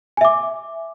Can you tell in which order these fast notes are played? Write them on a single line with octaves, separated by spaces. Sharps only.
G#5 E5 D6